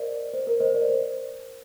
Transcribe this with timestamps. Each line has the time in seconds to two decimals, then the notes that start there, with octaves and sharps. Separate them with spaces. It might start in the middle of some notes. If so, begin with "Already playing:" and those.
Already playing: A#4 C5 D5 D#5
0.33 C5
0.47 A#4
0.60 C5 D#5
0.74 A#4 D5
0.89 C5